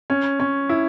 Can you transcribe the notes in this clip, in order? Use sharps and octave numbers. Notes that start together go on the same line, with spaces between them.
C#4
C#4
E4